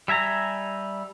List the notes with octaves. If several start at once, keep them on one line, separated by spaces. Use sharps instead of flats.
G3 E5 G#5 A#5